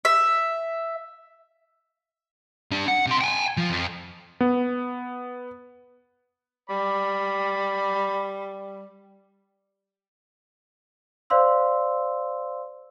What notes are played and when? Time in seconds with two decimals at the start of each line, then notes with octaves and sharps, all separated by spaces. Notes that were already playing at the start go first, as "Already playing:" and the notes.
0.05 E5
2.72 G3 D4
2.88 F#5
3.06 C3 C6
3.21 G5 G#5
3.57 F3
3.70 F2
4.41 B3
6.70 G3 D5 B5
11.30 C5 D5 F5 C6 E6